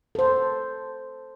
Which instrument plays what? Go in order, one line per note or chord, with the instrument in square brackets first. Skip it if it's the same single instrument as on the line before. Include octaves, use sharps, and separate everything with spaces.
[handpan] A4 C5